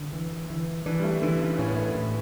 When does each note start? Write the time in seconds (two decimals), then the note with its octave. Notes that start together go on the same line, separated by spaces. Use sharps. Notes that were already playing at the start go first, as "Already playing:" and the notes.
Already playing: D3
0.13 E3
0.50 E3
0.86 E3 D4
0.99 G3
1.04 A3
1.22 D3 E3
1.40 C#3
1.58 A2 C#4
1.68 B3
1.76 A3
1.84 B3
1.96 A2